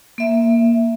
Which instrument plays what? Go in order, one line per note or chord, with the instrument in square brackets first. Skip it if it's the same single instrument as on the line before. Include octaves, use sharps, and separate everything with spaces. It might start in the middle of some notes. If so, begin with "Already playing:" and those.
[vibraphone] A#3 E5